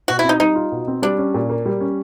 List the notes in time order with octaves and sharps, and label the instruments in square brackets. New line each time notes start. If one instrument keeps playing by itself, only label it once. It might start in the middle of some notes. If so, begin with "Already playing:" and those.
[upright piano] B2 [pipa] F#4
[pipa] E4
[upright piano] C4
[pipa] D#4
[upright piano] G3 [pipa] D#4
[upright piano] F4
B2
C4
[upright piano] G3 [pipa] D4
[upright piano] C#4
A#2
A#3
G3
C#4